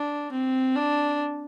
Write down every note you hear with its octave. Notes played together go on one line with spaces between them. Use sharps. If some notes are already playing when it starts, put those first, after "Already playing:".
Already playing: D4
C4
D4